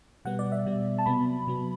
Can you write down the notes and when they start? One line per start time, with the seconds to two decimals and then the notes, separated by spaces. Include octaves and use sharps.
0.25 B2 G3 B3 F#5
0.39 D5
0.52 E5
0.66 B2 G3 B3
0.98 A5
1.06 C3 F#3 B3 B5
1.47 C3 F#3 B3